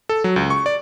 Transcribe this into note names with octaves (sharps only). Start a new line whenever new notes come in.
A4
F#3
C#2
C#6
D5